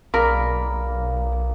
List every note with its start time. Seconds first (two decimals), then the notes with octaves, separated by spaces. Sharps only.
0.14 B1 A#3 G#4 A#4 D5 B5